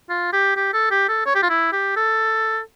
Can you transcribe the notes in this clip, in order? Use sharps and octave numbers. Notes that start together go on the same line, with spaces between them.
F4
G4
G4
A4
G4
A4
C#5
G4
F4
E4
G4
A4